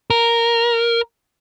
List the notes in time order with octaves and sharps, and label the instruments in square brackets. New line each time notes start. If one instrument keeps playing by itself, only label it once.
[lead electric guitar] A#4